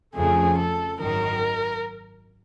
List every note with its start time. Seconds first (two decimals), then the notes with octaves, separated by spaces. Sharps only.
0.14 F2 C#3 F3 A3 G#4
0.58 A4
1.00 G#1 F#2 D#3 F#3 A#4